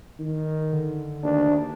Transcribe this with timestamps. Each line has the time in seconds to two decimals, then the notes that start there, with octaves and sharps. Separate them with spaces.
0.19 D#3
0.73 D3
1.23 D#2 D4